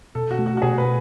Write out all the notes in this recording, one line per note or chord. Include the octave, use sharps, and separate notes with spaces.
B2 A4
F#4
A3
F#4
F#4
B2 G#4
B4